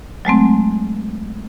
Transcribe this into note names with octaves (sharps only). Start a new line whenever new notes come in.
F#3 G#3 A3 C4